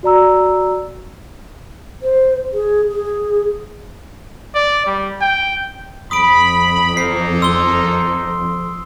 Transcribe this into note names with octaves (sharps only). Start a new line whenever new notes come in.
F#4 D5 A#5 E6
C5
G#4
G#4
D5
G3
G5
F2 B5 D#6 D7
A#3 D#4 A4 C7
C6 E6 G7